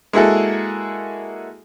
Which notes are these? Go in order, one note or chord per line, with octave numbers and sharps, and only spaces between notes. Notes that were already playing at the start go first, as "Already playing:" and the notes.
G#3 A#3 E4 F#4 G#4 A4